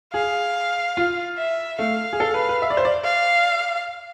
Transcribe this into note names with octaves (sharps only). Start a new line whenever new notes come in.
G#4 F5
F4
E5
A3 F5
G#4
A4
B4
B4
E5
D5
C5
D5
F5